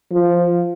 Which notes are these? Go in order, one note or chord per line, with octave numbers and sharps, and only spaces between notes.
F3